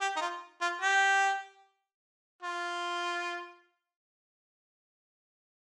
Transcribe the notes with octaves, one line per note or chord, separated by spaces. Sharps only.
G4
D#4
F4
F4
G4
F4